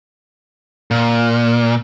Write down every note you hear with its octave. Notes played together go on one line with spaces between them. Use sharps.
A#2